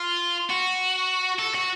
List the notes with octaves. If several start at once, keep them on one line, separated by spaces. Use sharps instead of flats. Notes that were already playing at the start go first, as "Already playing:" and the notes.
Already playing: F4
F#4
A4
F#4